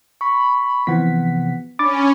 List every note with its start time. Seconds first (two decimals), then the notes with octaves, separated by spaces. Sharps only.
0.21 B5 C#6
0.87 C3 E3 F3 B3 F#5 B6
1.79 C#4 D4 B5 D6 A6